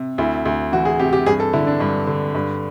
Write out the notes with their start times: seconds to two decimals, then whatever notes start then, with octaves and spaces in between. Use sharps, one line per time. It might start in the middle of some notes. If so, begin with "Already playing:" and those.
Already playing: C3
0.18 D2 E4
0.45 D2
0.72 E3 F#4
0.85 G#4
1.00 C3 G4
1.13 G4
1.26 G2 G#4
1.40 A4
1.53 D3 E4
1.67 D4
1.80 G2
2.07 D3
2.35 G2